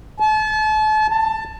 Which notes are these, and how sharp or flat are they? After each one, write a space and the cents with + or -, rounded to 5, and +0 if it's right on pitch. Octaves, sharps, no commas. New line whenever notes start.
A5 -35
A5 +15